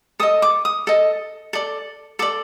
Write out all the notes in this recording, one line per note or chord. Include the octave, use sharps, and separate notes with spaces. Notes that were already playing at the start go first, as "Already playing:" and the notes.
A4 D#5 D#6
D6
D#6
A4 D#5
A4 D5
A4 D5 D6